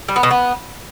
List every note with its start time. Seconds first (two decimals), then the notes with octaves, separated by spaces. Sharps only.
0.08 G3
0.16 B3
0.23 B2
0.31 B3